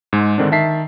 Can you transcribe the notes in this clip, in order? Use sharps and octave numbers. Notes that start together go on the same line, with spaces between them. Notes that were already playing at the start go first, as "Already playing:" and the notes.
G#2 G#3
G#2 D3 D#3 C4 D4
D#3 E5 A5 B6 C7